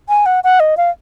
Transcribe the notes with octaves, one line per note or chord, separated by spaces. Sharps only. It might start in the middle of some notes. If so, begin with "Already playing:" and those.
G#5
F#5
F#5
D#5
F5